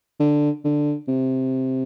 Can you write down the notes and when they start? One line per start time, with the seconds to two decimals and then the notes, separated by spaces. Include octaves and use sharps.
0.20 D3
0.65 D3
1.08 C3